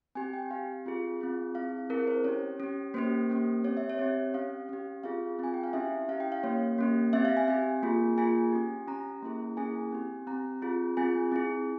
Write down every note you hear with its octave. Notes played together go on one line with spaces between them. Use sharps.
C4 G4 G#5
G5
C4 G4 F5
C4 F4 G#4
C4 F4 G#4
C4 E4 G#4 F5
C4 E4 G#4 A#4
C5
C#4 G4 C#5
C#4 G4
A#3 C#4 G4 C5
A#3 C#4 G4
C4 G4 C#5
E5
C#5
C4 G4
C#4 G4 F5
C#4 G4
C4 F4 G#4 F5
C4 F4 G#4 G#5
G5
F5
C#4 E4 G4 E5
C#4 E4 G4 F5
G5
F5
A#3 C#4 G4 C#5
A#3 C#4 G4
C4 G4 E5
F5
G#5
C4 G4 G#5
A#3 F4 G#4
A#3 F4 G#4 G#5
C#4 G4
C#4 G4 A#5
A#3 C#4 E4 G#4
A#3 C#4 E4 G#4 G#5
C4 G4
C4 G4 A#5
C4 F4 G#4
C4 F4 G#4 G#5
C4 E4 G#4